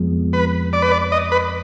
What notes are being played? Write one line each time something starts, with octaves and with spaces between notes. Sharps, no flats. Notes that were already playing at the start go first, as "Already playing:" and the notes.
Already playing: F2 F3 G#3 B3
B4
D5
B4
D5
D#5
B4